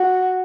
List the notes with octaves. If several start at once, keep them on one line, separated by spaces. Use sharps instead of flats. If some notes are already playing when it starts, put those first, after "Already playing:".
Already playing: F#4